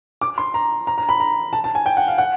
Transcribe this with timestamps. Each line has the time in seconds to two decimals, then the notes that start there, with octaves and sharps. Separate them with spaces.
0.21 D6
0.38 C6
0.54 A#5
0.87 A#5
0.98 A#5
1.09 B5
1.20 A#5
1.53 A5
1.64 A5
1.75 G#5
1.86 G5
1.97 F#5
2.08 F5
2.18 F#5